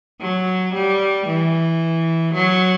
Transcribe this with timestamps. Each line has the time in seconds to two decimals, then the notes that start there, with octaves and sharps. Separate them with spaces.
0.21 F#3
0.74 G3
1.27 E3
2.34 F#3